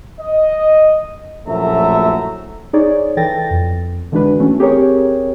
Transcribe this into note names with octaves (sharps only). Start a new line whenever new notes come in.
D#5
A#1 F#2 A2 A3 E5 A#5
D#4 G#4 C#5 D5
E3 A4 G5 A6 A#6
F2
D3 E3 G#3 D4 F#4 B4
E3 A3 C#4
C4 G4 G#4 A#4 C#5